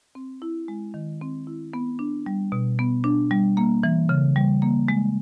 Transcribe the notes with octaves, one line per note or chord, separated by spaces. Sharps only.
C4
E4
G#3
D#3
C4
E4
B3
D4
G3
B2
B3
D4
G3
A#3
E3
C#3
G3
A#3
G#3